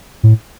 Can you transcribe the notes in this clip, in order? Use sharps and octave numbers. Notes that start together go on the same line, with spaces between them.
A2